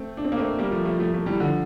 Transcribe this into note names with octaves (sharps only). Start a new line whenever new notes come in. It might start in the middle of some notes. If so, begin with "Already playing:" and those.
Already playing: A3 C4
D4
C4
A#3
A3 C4
G3 A#3
F3 A3
F3 A3
F3 A3
F3 A3
E3 G3
D3 F3